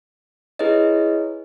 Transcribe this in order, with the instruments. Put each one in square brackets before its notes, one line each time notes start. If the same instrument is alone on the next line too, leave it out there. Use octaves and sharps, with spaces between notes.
[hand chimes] E4 G#4 B4 C#5 D#5